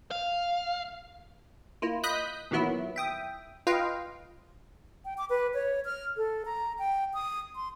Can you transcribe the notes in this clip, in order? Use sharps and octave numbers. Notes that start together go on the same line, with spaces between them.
F5
A#3 E4 F4
D#5 B5 D#6 F#6 G6 B6
A#2 D#3 E3 F#3 B3 E4
E5 G5 D#6
F4 B4 D#5 F5 G5
G5
D6
B4
C#5
F6
A4
A#5
G5
D#6
C6